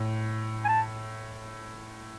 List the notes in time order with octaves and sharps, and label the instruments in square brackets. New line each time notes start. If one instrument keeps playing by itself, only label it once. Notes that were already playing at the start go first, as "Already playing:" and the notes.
Already playing: [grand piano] A2
[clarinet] G#5
A5